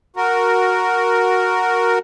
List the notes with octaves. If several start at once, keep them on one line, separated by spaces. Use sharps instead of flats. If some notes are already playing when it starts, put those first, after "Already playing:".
F#4 A#4